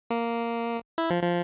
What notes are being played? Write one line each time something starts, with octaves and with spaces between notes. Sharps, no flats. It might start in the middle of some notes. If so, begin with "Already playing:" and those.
A#3
E4
F3
F3